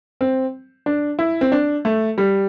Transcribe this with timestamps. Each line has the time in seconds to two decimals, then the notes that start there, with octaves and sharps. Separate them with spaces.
0.21 C4
0.86 D4
1.19 E4
1.41 C4
1.52 D4
1.85 A3
2.18 G3